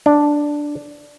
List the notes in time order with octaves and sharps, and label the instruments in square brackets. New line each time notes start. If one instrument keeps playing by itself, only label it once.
[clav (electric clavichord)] D4